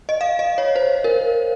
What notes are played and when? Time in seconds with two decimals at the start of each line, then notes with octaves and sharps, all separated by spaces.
0.09 D#5
0.21 F5
0.39 D#5
0.58 C#5
0.76 C5
1.04 A#4